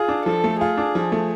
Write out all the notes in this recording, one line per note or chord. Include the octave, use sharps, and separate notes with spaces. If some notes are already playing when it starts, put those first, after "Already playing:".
Already playing: F4 G#4
D4
F3 A4
A3
F4 G#4
D4
F3
A3